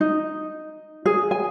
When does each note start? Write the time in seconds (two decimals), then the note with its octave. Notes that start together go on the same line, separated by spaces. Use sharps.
0.01 D#4
1.06 G#4
1.31 G#5